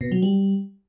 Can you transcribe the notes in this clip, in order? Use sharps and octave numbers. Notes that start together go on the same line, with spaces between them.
B2
F#3
G3